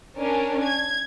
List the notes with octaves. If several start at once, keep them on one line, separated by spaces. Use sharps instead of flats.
C#4 D4 A#4
G#6